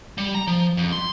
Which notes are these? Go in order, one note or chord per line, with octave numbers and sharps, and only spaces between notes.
G3
A#5
F3
F2
C6